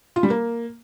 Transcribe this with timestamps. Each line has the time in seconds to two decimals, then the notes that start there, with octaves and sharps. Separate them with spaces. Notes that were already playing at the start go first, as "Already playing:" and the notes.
0.16 F4
0.23 G3
0.30 A#3